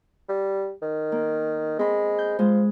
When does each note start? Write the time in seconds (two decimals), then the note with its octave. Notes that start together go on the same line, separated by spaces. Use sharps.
0.29 G3
0.82 D#3
1.12 A#3
1.79 G#3 C4 B5
2.19 G6
2.39 F3 G#3